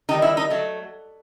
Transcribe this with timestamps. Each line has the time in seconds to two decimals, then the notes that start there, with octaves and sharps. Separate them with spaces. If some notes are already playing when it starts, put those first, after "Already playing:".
0.09 D#3 G3 D#4
0.22 E4
0.37 D#4
0.50 F#3 A3